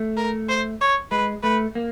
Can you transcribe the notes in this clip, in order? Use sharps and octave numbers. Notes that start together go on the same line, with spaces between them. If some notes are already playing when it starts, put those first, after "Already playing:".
Already playing: A3
A#4
C5
C#5
G#3 B4
A3 B4
A#3